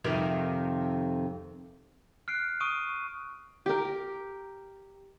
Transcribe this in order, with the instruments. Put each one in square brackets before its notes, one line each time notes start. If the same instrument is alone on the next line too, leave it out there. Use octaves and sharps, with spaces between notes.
[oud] F2 C3 D#3
[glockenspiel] F6 F#6 C7 D7
C#6 D#6 D7 D#7
[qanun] G4 A#4